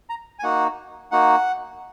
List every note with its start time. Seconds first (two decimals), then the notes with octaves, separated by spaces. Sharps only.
0.09 A#5
0.39 G#5
0.43 A#3 D#4 F#4 F#5
1.11 A#3 D#4 F#4 F#5